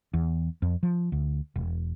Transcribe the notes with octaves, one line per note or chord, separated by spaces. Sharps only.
E2
F2
F3
D2
E1